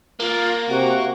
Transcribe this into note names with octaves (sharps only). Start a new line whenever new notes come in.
A#3 F4
C3 F#4 F#5